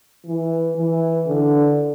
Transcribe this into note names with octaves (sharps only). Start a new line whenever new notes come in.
E3
E3
D3